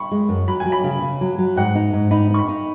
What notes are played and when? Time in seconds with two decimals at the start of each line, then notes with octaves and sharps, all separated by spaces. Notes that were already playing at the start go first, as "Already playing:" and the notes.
Already playing: B5 C#6
0.11 G#3
0.29 F#2
0.48 F#3 B5
0.60 G#5
0.65 F#3
0.72 B5
0.84 C#3
1.02 C#3
1.21 F#3
1.38 F#3
1.56 G#2 F#5
1.75 D#4
1.93 G#2
2.11 D#4 B5
2.30 D#4 C#6
2.39 B5
2.49 D#4